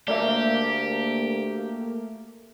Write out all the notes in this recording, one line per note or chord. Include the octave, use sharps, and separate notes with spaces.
D2 A3 A#3 G4 D5 E5